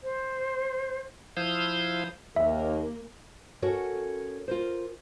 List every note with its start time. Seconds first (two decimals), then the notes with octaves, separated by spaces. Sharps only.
0.03 C5
1.37 F3 E4 C5 F5 D#6 G6
2.36 D#2 A#3 E5
3.62 C#4 F#4 A4 A#4 C#5
4.48 F4 A#4 C5